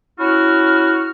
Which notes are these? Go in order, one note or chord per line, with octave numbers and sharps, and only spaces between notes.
C#4 E4 F#4 F6